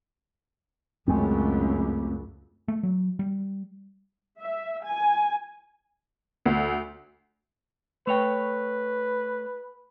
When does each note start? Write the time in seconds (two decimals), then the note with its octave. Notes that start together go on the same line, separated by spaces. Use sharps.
1.08 C#2 F#2 G#3 A3 C4
2.68 A3
2.83 F#3
3.19 G3
4.39 E5
4.84 G#5
6.46 D2
8.07 A3 B4 C#5 G5